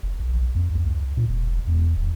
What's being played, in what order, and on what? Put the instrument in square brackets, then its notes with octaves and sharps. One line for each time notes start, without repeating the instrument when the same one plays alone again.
[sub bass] F#1
B1
F2
C#2
A#2
E1
E2
D1